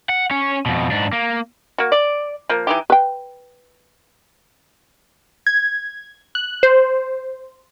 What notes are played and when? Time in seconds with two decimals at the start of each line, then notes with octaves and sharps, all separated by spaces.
0.09 F#5
0.31 C#4 C#5
0.66 F2 B2
0.91 G#2 D4
1.13 A#3
1.78 A#3 F#4
1.92 D5
2.49 F3 A#3
2.67 E3 D#4 G4
2.90 B4 G5
5.47 G#6
6.35 F#6
6.63 C5